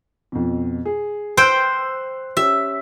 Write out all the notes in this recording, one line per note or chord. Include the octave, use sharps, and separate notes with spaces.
F2 B2
G#4
C5 G5 E6 F#6
C#4 G4 E5